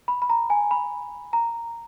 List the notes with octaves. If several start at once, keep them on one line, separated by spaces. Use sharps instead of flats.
B5
B5
A#5
G#5
B5
A#5